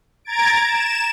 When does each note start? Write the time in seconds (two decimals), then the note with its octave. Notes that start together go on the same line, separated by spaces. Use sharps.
0.25 A#5 G#6 A6 D7
0.65 E7